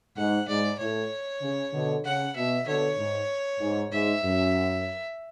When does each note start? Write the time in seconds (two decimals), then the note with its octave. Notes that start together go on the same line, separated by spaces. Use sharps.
0.16 G#2 F#5
0.48 G#2 D5
0.79 A2 C#5
1.42 C#3
1.72 B2 D3
2.04 C#3 F#5
2.36 B2 E5
2.66 B2 D3 C#5
2.98 G#2
3.61 G#2
3.91 G#2 E5
4.23 F#2